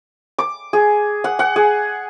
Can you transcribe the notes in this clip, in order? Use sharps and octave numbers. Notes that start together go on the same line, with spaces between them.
D6
G#4
F#5
F#5
G#4